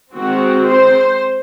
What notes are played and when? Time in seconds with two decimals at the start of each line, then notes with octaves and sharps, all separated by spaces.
0.13 D#3 G#3 C4 F#4
0.68 C5